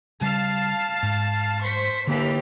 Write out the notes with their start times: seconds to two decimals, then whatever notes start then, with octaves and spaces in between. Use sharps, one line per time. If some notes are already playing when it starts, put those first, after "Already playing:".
0.21 C#3 G3 F5 A5
1.03 G#2
1.63 C5 C#6 B6
2.07 D#2 D3 E3 A#3 G4